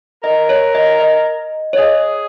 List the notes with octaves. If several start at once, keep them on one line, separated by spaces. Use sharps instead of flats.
A#4 D#5
C#5
D#5
D#5
C#5
G#4 D#5